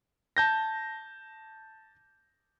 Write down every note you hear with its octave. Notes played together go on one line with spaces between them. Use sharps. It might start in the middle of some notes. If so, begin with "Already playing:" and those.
A5 G6 A#6